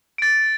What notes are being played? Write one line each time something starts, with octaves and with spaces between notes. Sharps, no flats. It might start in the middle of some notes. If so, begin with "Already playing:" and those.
A6 D7